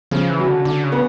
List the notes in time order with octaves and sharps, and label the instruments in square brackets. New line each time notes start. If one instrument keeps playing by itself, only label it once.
[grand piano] C#3 [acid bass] F3
[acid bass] E3
[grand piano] F#3
[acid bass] D3
[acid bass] D3 [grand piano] D4
[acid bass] C#3
[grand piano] B3